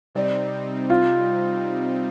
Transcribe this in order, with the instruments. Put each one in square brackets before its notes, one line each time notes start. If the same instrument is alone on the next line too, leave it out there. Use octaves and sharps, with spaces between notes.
[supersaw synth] C3 G3 C4 D#4 [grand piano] D5
[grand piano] F4